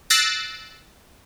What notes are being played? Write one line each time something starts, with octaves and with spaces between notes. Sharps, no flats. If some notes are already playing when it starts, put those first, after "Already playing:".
E6 F#6 A6 A#6 C7 D7